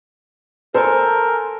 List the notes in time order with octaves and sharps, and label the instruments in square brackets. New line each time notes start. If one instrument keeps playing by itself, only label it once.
[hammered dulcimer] A4 C6 [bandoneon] A#4 [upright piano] C5 G#5